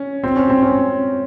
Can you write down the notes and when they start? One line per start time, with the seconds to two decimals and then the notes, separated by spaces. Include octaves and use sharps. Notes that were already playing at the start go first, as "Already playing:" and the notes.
Already playing: C#4
0.23 C4
0.36 C#4
0.50 C4
0.62 C#4